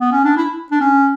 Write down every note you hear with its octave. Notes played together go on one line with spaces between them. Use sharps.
B3
C#4
D4
E4
D4
C#4